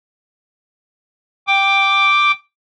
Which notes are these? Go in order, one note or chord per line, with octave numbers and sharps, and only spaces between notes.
G5 D6